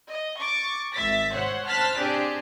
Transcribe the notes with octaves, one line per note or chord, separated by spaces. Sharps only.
D#5
C#6 D6 A6
G#1 E5 A6 B6
C5 C#5 F#5 C6
C5 A5 F6 F#6 A6 B6
C4 D4 G4 G#4 D5